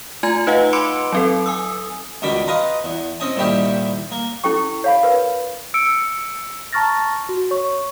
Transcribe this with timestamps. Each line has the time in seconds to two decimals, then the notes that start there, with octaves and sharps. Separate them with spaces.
0.23 A3 F4 G#5 A#5 G#6
0.47 D#4 B4 D#5 F5 F#5
0.73 B5 C6 D6 E6 C#7 D7
1.12 F#3 C4 A4
1.46 G#5 D#6 E6
2.22 C#2 B2 D#3 D5 B5 D6
2.47 B4 D#5 F5 G#5 A#5 C6
2.84 E2
3.20 C4 C#4 D#5 G#5
3.37 C2 A#2 D#3 E4 G4 G5
4.11 A#3
4.44 C#4 E4 A4 G5 C#6
4.84 C#5 F5 B5
5.03 A#4 B4
5.74 E6 C#7 D7
6.73 A5 A#5 C#6 F6 A6 A#6
7.29 F#4
7.51 C#5 C#6